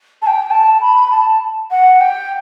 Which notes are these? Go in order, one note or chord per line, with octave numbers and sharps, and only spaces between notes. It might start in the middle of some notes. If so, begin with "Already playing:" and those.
A5
G5
A5
B5
A5
F#5
G5